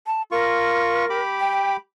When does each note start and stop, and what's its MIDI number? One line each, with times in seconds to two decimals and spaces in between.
0.07 0.22 81
0.32 1.05 65
0.32 1.20 70
0.32 1.05 85
1.10 1.77 67
1.10 1.77 83
1.10 1.77 86
1.40 1.73 79